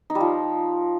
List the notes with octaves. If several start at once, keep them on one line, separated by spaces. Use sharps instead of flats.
D#4
G3
F3